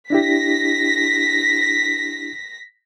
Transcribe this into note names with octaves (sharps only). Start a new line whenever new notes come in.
D4 E4 G4 A#6 B6